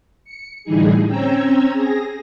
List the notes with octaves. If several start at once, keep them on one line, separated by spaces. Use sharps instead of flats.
C#7
A2 D3 E3 G3 D#4 G#4
C4 C#4 G5 A#5 E6 G#6
G#4 A#6